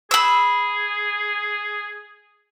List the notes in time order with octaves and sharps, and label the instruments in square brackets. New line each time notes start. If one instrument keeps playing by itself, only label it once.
[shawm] G#4 [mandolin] B5 E6